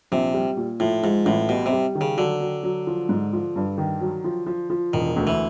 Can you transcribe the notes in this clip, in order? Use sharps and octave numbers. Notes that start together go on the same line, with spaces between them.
A#1 C3
G3
A#2
A2 F3
G#2 F3
A1 A2
B2 G3
C3
G3
D#3
C#3
D3 F#3
F#3
F#3
F3
G#2
F3
G2
D#3
F#3
F3
F3
F3
E1 D#3
D2
E3